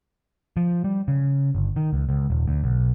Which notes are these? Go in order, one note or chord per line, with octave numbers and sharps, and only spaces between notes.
F3
G3
C#3
G1
D#3
C#2
C#2
D#1
D2
B1